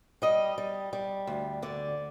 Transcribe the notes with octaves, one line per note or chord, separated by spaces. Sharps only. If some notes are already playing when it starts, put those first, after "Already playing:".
G3 D#5
G3
G3
D2
D3 D5